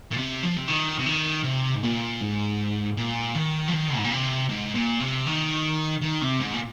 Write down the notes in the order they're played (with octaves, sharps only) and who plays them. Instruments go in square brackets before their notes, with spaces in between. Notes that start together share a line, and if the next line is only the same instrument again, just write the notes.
[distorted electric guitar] A#2
C3
F3
C3
D#3
C3
D#3
C3
G#2
A#2
G#2
A#2
D#3
F3
D#3
G#2
A#2
C3
G#2
A#2
C3
D#3
D#3
C3
G#2
A#2